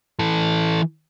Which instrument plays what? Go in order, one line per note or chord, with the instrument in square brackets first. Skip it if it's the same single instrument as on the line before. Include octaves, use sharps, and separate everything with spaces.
[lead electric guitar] E3 A4